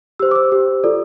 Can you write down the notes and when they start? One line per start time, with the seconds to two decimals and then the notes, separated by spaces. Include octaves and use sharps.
0.19 G4 C5 E6
0.31 D6
0.35 E6
0.52 G4 C5
0.84 F4 A4 D5